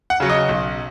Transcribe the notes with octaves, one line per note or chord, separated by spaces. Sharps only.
F#5
C#3 F#3
D#5
B1